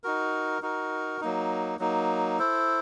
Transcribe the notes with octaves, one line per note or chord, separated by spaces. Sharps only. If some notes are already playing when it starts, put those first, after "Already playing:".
D#4 F#4 A#4
D#4 F#4 A#4
F#3 A#3 D#4
F#3 A#3 D#4
E4 A4 C5